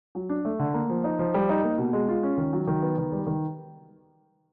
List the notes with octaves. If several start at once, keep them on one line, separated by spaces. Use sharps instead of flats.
F#3
D4
A3
D3
A#3
F3
D#4
F3
G3
D#4
A#3
B2
G#3
F4
C#4
D#3
F#3
D#3
B3
D#3
G3
D#3